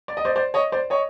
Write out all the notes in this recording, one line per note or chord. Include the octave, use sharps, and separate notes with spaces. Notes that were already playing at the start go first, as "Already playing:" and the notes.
D5
D#5
C5 D5
C5 D5
C#5 D#5
C5 D5
C#5 D#5